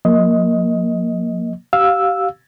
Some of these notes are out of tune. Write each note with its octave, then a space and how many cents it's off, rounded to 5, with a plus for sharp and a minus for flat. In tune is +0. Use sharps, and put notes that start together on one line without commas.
F3 +45 A#3 +0 D#5 +15
G4 -35 F5 +15 E6 +0